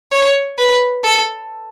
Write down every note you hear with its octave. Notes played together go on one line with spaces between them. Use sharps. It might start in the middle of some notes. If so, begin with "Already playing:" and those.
C#5
B4
A4